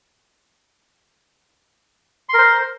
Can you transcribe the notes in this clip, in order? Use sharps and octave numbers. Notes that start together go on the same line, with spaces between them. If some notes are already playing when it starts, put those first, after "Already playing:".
A#4 C5 C6